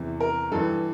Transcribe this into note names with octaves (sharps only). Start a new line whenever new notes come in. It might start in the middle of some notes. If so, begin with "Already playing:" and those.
Already playing: E2 C3 E3
A#4
G2 E3 A4